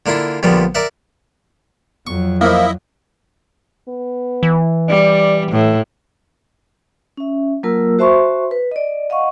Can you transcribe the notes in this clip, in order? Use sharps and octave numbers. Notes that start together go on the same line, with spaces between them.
D3 A#3 D4 E4 F4
A#1 D3 F3 G3 A#3 B3
A#4 D5 E5 F#5
F2 F#3 C#6
F3 A#3 E4 D#5 E5
B3
E3
G3 D5
A2 A3
C#4 E5
F#3 A#3 F4 A#4 A5 E6
F#4 C5 E5 A5 C6 C#6
B4
D5 D#5
D#5 F5 F#5 C#6